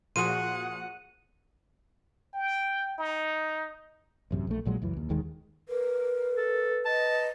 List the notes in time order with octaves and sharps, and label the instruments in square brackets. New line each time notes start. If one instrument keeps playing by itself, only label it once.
[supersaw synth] A#2 F3 F#4 [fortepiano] G#4 C6 [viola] F#5 [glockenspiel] D#7
[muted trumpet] G5
D#4
[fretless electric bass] A1 F#2 C3
A#1 A3
A#1 A#2 F#3 G#3
C#2 F#2 E3
D#2
E1 D#2 D#3 G#3
[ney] A#4 [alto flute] B4
[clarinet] A4
[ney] D#5 [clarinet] A5